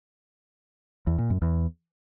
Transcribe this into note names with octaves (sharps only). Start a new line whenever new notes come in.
E2
A#2
F#2
E2